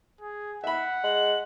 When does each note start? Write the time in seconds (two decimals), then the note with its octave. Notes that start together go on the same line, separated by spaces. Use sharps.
0.21 G#4
0.64 E5 F#5 B5
1.04 G#3 F#7